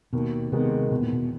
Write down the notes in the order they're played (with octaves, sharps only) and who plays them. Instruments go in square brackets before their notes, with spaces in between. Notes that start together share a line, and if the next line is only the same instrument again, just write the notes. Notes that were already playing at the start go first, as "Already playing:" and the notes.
[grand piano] D#2 [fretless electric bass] B2
[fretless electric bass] C3 [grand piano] D#3 G#3 B3
[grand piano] E2 [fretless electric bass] B2
[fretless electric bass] A#2
B2